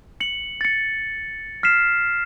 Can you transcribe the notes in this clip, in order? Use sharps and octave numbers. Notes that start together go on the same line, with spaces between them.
C#7 F#7
A6 C#7
F6 B6 C7 E7